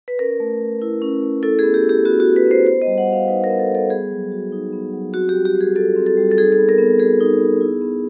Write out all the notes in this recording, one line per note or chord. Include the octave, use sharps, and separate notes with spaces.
B4
C#4 A#4
A3
A3
E4
C#4
A3
E4 A4
B3 G#4
G4
E4
G4
B3 F#4
F#4
E4
B4
B3
C5
B3 C5
D#5
G3
F#5
F#4
F5
D#4 B4
A#4
B3
A4
G3
A4
B3 G#4
F#3
F#4
D#4
B3
F#3
C4 F#4
G4
G3
G4
G3
G#4
F4 A4
C4
A4
G3
A4
D#4 G#4
A4
B3
A#4
B3
F#4 G#4
D#4
B3
E4
B3